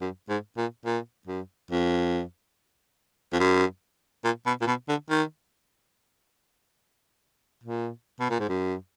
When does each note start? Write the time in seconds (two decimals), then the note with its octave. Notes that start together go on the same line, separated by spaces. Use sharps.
0.01 F#2
0.29 G#2
0.57 A#2
0.86 A#2
1.27 F#2
1.71 F2
3.33 F2
3.39 F#2
4.24 A#2
4.46 B2
4.61 A#2
4.67 B2
4.89 D3
5.10 D#3
7.64 A#2
8.20 B2
8.30 A#2
8.40 G#2
8.49 F#2